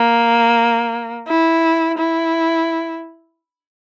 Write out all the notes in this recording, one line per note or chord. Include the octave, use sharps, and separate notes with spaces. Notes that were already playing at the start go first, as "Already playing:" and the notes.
Already playing: A#3
E4
E4